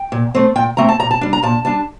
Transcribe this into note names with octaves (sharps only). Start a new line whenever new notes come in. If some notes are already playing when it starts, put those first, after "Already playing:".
Already playing: G5
A#2
A3 C4
A#2 G5
A3 C4 A#5
A5
A#2 A#5
A5
G3 D4
A#5
A#2 A5
G3 D4 A5